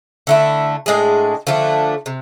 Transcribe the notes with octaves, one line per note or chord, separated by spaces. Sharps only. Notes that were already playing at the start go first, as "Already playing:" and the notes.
D3 A3 E4
A2 G#3 D4 G#4
D3 F3 A3 D4
C3